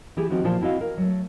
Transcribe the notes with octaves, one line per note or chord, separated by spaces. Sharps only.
E3 E4 G4 G#4
E3 F3 C4 D#4 F#4
A#2 E3 F3 F4 C5 A5
C4 E4 F#4 D#5 F5
A#4
F#3 A3